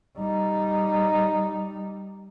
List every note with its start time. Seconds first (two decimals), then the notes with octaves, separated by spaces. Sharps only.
0.18 G3 D#4